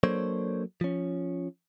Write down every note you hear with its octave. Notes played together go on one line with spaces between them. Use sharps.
F#3 A#3 D4 A4 C5 C#5
F3 C#4